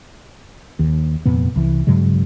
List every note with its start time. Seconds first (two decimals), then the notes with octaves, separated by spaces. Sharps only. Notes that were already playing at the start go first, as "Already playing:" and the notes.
0.79 D#2
1.26 F1 F2 A#2 B3
1.56 C2 E3
1.87 G2 C#3 F#3 G#3